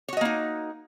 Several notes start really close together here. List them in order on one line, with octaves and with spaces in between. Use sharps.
C#5 F#4 D#5 A#3 D#4